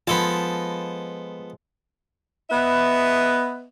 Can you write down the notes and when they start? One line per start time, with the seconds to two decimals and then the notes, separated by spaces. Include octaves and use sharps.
0.07 F3 G#3 B3 F4 A4 A5 B5
2.50 B3 B4 D#5 E5